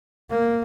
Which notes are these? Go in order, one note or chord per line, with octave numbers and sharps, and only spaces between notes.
A#3